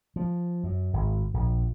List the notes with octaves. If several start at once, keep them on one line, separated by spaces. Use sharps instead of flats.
F3
F#2
G#1
A#1